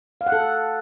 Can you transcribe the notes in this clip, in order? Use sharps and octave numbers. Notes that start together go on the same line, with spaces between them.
F5
F#5
A4